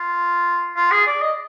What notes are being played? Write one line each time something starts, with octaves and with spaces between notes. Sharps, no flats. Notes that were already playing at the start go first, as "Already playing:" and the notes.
Already playing: F4
F4
G#4
D5
D#5